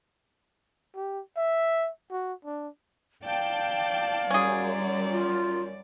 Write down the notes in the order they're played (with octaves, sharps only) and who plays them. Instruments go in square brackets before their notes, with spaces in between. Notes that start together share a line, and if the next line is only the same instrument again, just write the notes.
[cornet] G4
E5
F#4
D4
[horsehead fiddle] D5 [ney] F5 [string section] G5 A5
[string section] F#2 G3 [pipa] C#4 G#4
[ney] F4